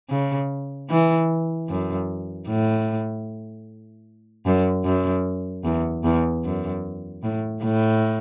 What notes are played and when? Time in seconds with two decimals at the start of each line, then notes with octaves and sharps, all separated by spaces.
0.10 C#3
0.90 E3
1.69 F#2
2.48 A2
4.46 F#2
4.85 F#2
5.65 E2
6.04 E2
6.45 F#2
7.23 A2
7.63 A2